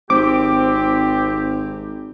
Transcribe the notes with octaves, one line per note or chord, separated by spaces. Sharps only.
G#1 C4 G4 D6